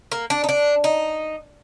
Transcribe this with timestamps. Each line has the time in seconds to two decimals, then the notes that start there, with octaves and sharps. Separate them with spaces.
0.12 A#3
0.30 D4
0.44 D#4
0.49 D4
0.84 D#4